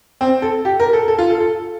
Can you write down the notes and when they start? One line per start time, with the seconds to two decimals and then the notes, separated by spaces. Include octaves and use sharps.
0.21 C4
0.42 A4
0.65 G4
0.80 A#4
0.93 A4
1.08 A4
1.19 F4
1.30 A4
1.40 A4